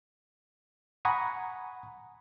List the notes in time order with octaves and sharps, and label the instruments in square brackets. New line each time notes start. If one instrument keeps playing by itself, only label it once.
[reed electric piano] F#5 G#5 A#5 B5 C#6 D#6